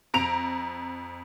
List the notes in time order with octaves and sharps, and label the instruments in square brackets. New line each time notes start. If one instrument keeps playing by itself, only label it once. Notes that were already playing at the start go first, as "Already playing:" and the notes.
[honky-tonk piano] F2 A#5 D7 F7